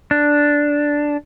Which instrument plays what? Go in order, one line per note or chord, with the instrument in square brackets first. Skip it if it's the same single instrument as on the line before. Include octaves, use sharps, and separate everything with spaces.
[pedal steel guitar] D4